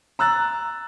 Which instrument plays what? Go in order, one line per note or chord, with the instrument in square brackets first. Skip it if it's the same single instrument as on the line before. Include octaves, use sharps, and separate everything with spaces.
[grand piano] A#5 E6 F#6 A6